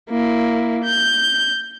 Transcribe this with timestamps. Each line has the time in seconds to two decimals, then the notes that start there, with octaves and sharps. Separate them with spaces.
0.10 A#3 E4
0.84 G6